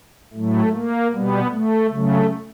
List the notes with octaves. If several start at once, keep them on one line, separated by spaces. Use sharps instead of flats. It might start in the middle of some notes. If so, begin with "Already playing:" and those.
A2 F#3 A3
A#3
B2 G3 B3
A3
C#3 F#3 A3